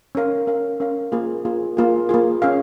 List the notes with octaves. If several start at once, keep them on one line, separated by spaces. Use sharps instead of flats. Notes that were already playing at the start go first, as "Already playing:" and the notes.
C#4 A#4 F5
C#4 A#4 F5
C#4 A#4 F5
A#3 F4 G#4
A#3 F4 G#4
A#3 F4 G#4
A#3 F4 G#4
C#4 G#4 F5